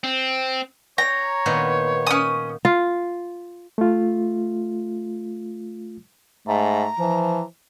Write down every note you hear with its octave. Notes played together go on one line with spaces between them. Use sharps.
C4
C#5 G5 A#5
A#2 D#3 B3
C#4 D#6
F4
A3 F4
G#2 A3 A#5
E3 F3